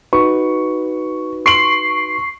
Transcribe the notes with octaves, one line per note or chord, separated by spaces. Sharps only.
D#4 F#4 B4 C#6
C6 C#6 C7 D7 F#7